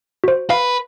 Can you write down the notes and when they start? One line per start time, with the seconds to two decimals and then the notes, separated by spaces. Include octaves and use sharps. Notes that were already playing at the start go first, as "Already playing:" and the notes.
0.24 F#4 C5
0.50 B4 F5